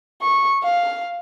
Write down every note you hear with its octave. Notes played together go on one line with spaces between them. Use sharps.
C#6
F5